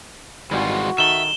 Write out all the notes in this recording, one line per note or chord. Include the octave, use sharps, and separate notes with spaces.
G#1 E3 G3 G#3 F4 F#4 G#4
D#3 A4 E5 E7 G7